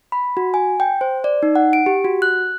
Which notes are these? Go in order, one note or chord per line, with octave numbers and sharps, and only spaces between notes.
B5
F#4
G#5
G5
C5
D5
D#4
F#5
D7
G4
F#4
F#6